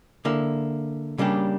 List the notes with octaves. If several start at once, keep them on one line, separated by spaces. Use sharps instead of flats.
D3 A#3 E4
C#3 G3 A#3 D4 G4